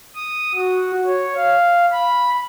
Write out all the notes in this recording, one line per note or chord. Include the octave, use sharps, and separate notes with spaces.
D#6
F#4
C#5
F5
B5